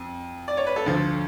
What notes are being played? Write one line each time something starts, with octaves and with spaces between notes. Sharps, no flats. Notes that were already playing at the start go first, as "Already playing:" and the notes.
Already playing: F2
D5
C#5
B4
A4
D2 D3 F3 A4